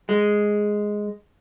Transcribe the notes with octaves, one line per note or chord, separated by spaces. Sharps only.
G#3